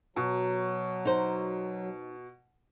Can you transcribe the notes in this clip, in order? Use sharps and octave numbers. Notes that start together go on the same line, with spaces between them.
B2 F#3
D#4 C5